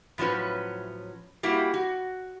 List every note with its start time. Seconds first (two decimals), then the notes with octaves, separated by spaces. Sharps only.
0.18 A2 F3 F#3 C#4 B4
1.43 G3 A#3 E4 F#4 G4
1.74 F#4